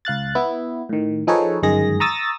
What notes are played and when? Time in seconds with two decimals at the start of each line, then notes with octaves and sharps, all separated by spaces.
0.05 C#2 F5 F#6 A6
0.35 B3 E4
0.89 A2 D#3
1.27 F3 D#4 G#4 A4 B4 C#5
1.63 G1 F#2 D#3 G#3 G#4 A#6
2.00 A#5 C#6 D#6 E6 A6 A#6